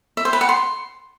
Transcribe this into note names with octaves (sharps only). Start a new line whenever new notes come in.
E5
C5
B4
F#5
C6